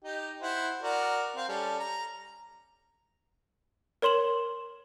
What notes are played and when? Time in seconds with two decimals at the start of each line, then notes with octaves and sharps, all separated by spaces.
0.04 D#4 G4
0.42 E4 C5 F#5
0.83 F#4 A#4 D5
1.36 C4 F5
1.48 G3 C#4 A4
1.79 A#5
4.02 A#4 C#5 C6 E7 F#7